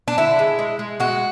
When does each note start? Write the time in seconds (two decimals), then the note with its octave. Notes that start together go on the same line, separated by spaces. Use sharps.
0.08 D4
0.18 D3 E4
0.39 G#3
0.59 G#3
0.79 G#3
1.00 G#3 F#4